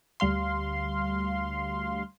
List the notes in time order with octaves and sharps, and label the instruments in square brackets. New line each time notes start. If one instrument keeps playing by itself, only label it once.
[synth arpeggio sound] D2 G3 F5 C6